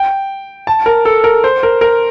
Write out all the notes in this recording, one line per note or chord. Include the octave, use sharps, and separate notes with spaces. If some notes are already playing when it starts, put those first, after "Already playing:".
Already playing: G5
A5
A#4
A4
A#4
C5
A#4
A#4